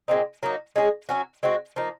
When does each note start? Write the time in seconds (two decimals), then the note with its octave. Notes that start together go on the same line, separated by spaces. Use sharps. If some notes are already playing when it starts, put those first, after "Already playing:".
0.08 A#2 G#3 C4 D#4
0.43 F#3 A#3 D#4
0.76 G#3 C#4 G#4
1.09 F#3 C#4 F#4
1.43 G#3 C4 F#4
1.76 F3 A#3 D#4